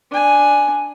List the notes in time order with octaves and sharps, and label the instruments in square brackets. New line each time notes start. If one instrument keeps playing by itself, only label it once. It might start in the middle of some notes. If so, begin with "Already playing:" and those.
[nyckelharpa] D4 G#5